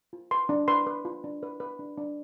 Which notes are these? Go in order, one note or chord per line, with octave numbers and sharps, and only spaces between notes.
F4
B4 C6
D4
B4 C6
B4
F4
D4
B4
B4
D4
D4